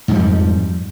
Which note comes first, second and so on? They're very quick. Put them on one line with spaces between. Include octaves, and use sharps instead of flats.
G#2 F3 G3 F2